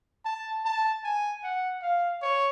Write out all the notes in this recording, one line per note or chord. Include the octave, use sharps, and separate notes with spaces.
A5
A5
G#5
F#5
F5
C#5